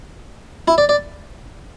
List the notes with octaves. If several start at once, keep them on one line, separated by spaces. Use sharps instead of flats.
E4
D5
D5